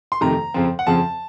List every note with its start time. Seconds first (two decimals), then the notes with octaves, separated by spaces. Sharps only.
0.12 C6
0.21 F2 C3 D#3 A3 A#5
0.54 F2 C#3 F3 C4
0.79 F#5
0.87 F2 C#3 F3 C4 A5